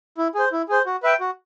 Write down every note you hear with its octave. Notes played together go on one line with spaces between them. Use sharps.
E4
G#4 C5
E4
G#4 C5
F#4
B4 E5 G5
F#4